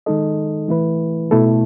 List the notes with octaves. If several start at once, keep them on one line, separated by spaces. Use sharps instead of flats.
D#3 G#3 D#4 A4 D#5
E3 A3 E4 B4
B2 A3 E4 A4